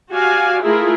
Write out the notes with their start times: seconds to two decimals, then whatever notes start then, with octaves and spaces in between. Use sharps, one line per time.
0.11 F#4 G4 D5 F5 G#5
0.61 A3 E4 F4 G#4 A#4